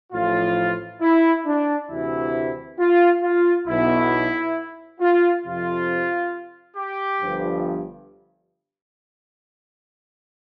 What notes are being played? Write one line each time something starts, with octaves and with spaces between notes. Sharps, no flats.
A1 A2 F3 F4
E4
D4
D2 C3 E3 E4
F4
F4
B1 B2 E4
F4
F2 C3 F3 F4
G4
G1 G2 F3